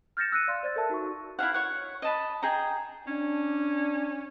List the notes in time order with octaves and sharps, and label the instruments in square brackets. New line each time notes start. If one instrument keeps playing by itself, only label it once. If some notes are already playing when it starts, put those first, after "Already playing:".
[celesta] F6 G6 A6 A#6 C#7 E7
E6 F#6 A#6 C#7 D#7
D5 F5 C6
C5 D5 F#6 A6
A4 A#4 E5 A5
D#4 F#4 A4 C#6
[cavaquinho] E4 F#4 F5 F#5
C#5 F#5
D#5 A5 B5
G#4 D#5 G5 A#5
[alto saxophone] C#4 [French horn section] D4